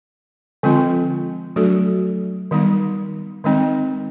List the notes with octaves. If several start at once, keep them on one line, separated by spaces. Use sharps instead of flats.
D3 F3 G#3 C4 F4
F#3 A3 D4 F#4 A4
D#3 G3 B3 D#4
D#3 G#3 C4 D#4